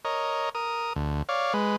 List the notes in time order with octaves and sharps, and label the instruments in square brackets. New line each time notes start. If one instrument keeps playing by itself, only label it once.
[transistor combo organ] A#4 C#5 D#5
A#4 D#6
D2
C#5 D5 F5
G#3 B4